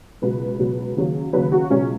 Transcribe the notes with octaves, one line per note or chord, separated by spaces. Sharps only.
C#2 B2 F#3 B4
C#2 B2 F#3
D#2 C#3 F#3
D#2 C#3 F#3 B4
F#4
C#2 B2 F#3 C#4